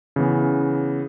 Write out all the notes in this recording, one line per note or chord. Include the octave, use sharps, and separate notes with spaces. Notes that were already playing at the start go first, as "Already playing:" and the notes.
C#3 E3 B3